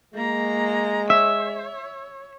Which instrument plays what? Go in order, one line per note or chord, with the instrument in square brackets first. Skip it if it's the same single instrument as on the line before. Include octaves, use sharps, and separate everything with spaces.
[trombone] G#3 [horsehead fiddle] A#3 A#5
[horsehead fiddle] C#5 [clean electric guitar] E5